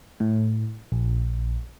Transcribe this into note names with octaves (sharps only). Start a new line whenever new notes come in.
A2
A#1